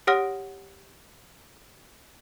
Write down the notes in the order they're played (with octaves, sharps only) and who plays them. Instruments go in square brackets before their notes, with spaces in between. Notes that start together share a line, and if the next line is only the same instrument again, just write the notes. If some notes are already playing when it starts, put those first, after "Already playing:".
[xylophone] G4 C#5 F#5 D#6 F6 A#6